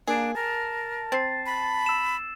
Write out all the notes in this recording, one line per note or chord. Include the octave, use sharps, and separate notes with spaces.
A#3 D4 G#4
A#4 A5
C4 A6 C7
B5
E6 E7